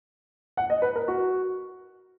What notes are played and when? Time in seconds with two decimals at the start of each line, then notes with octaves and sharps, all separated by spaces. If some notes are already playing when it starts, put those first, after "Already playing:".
0.57 F#5
0.70 D#5
0.82 B4
0.96 A#4
1.08 F#4